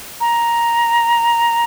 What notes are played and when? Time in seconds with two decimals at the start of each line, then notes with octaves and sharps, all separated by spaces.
0.21 A#5